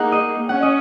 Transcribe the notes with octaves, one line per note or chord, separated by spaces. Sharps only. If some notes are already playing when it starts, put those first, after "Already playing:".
Already playing: A#3 D#4 G#4 F#5
D#5
C#4 F#5
D#5